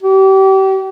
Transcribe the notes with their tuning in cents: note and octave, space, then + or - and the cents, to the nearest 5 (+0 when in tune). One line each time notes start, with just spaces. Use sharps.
G4 -35